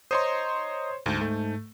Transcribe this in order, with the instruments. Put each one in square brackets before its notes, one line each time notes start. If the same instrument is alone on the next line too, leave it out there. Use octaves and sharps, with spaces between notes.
[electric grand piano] C5 C#5 C6 [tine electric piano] D#5 A#5 D#6
[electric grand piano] D2 [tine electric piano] G#2 A5 G6
[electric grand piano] A3